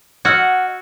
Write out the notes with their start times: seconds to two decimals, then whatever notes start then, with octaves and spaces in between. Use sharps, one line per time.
0.25 F#4 D#5 F#5 E6 F6 G#6